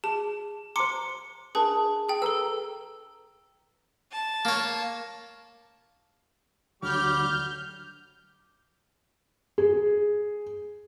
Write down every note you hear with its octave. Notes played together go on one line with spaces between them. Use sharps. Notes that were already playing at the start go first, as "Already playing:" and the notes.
G#4 A5
C5 A#5 C6 D6 C#7
D4 G#4 A#4 B4 A5
G#4 G5
A4 B4 A#5 E6
A5
A#3 C#5
D2 F#3 G3 D6 F6 G6
G#4